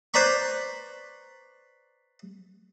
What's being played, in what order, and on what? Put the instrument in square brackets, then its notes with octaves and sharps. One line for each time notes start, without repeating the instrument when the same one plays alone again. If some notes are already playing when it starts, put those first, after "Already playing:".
[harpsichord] B4 C5 D5 A#5 B5 C#6